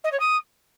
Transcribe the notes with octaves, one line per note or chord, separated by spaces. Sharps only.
D#5
C#5
D#6